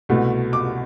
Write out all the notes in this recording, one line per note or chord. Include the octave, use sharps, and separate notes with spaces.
C2 B2 A3
D6